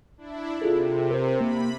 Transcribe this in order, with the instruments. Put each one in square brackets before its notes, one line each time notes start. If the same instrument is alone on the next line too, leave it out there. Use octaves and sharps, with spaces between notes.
[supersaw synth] D4 E4
[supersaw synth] C3 [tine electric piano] F4 G#4 A4
[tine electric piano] A#4 C5
[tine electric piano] A#3 [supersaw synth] B5